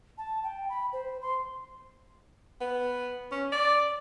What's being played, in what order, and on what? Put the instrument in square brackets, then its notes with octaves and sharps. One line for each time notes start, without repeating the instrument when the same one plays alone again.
[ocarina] A5
G5
B5
C5
C6
[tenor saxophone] B3
C#4
D5